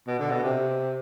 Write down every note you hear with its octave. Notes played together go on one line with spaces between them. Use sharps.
B2
D3
B2
C3